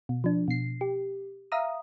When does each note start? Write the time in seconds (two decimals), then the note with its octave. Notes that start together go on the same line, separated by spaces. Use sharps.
0.09 B2
0.24 F3 D4
0.48 B2 C7
0.81 G4
1.52 E5 F5 A#5 D#6